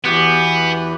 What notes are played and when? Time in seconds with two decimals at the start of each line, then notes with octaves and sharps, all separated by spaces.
0.05 E2 E3 B3 F#4 G4 F#5